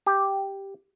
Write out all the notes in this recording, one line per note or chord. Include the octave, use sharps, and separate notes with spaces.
G4